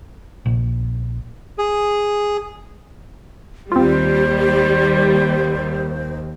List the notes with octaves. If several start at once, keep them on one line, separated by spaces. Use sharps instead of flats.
A#1
G#4
D#2 D#3 G3 C4 F4 C5